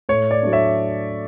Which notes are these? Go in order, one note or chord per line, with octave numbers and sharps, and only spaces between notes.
A2 C#5
D5
F#3 A3 D4
C#5 E5